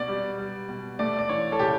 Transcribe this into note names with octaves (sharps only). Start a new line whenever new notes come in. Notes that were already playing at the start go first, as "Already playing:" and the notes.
Already playing: B2 D5
G3
G3
B2
A3 D5
D5
E3 C#5
A4
C#3 G4